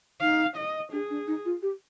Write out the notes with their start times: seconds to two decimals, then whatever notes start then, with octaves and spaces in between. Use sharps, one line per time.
0.21 D#4 F5
0.56 D#5
0.92 D4 G#4
1.10 D4
1.27 D#4
1.45 F4
1.62 G4